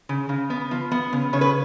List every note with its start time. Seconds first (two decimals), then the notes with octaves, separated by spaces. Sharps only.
0.09 C#3
0.29 C#3
0.50 B3
0.71 F3
0.92 B3
1.13 C#3
1.33 C#3 C#5
1.41 B4